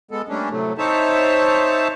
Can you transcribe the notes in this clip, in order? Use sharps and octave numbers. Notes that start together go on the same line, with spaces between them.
G#3 B3 A4
G3 A3 A#3 C#4 D4
A2 C3 F#3 A3
C4 D#4 C5 C#5 E5 A5